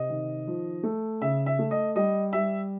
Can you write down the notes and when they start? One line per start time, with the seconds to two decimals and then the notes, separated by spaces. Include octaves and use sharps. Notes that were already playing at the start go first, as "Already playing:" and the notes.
Already playing: C3 D#5
0.09 D#3
0.47 F3
0.83 A3
1.21 C#3 E5
1.46 E5
1.59 A3
1.71 D#5
1.96 G3 D#5
2.33 G3 E5